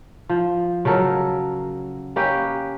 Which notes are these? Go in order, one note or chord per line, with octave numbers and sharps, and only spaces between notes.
F3
C#3 F#3 A4 A#4
A#3 C#4 G4 B4